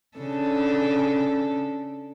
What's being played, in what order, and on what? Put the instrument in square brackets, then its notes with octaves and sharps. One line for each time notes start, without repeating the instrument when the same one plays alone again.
[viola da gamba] C#3 D4 A4